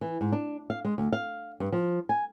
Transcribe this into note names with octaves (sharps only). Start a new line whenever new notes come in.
E3
G#2
D4
F5
G#3
D2
F5
G2
F3
G#5